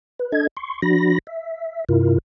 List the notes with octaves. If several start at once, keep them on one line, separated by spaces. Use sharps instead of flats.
B4
D4 A4 D#5 G#6
C6 C#6
F3 D4 F#4 B5 A#6
E5
G2 C3 E4 F4 A#4